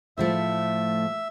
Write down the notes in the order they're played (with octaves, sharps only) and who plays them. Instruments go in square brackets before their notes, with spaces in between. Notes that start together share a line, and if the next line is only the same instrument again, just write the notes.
[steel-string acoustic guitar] A2 F3 A3 [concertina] E5